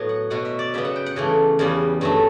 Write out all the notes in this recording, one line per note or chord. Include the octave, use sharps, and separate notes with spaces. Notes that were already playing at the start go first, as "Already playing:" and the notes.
Already playing: A2 F#3 B3
F#5
B2 F#3 B3 F#5
E5
D5
C#3 F#3 B3 E5
F#5
G5
F#5
C#3 E3 A3
E2 C#3 G3 B3
G2 F#3 A3 E5